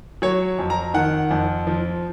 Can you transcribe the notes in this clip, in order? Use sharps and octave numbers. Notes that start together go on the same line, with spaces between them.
F#3 C#5
F2
A#5
D#3 F#5
F2
F3